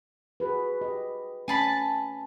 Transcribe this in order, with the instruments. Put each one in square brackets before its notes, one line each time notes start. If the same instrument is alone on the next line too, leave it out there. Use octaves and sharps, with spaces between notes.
[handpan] F#4 G#4 B4
G4 D#5
[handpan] A3 C4 C#4 [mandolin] G#5 A5 B5